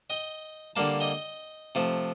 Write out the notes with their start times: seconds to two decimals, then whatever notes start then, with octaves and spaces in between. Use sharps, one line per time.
0.10 D#5 G5
0.76 D3 G3 A#3 F5 A5
1.00 D#5 G5
1.75 C3 F3 A3